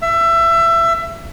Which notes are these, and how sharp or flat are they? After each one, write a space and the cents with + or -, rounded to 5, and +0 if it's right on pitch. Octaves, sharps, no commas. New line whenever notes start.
E5 +25